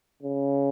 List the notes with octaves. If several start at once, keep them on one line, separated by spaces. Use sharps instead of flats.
C#3